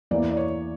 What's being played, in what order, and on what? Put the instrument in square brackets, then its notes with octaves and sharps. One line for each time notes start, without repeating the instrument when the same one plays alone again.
[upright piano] E2 E3 A#3 [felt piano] D5
[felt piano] D5
C#5